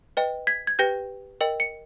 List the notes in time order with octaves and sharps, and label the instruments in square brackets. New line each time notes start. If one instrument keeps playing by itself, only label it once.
[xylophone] B4 D#5 G5
G#6 B6
G#6
G4 B4 G5 G6 A#6
A#4 D#5 G5
C#7